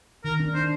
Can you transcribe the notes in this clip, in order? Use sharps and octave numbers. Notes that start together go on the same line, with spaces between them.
D#3 A#4
D4
D4 C5